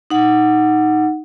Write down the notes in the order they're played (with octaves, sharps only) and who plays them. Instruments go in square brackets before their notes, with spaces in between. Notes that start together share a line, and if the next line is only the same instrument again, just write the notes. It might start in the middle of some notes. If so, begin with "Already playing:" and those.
[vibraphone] D#4 F#5